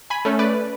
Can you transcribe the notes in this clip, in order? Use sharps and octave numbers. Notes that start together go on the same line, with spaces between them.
G#5 B5
A3 C#4
B4 D5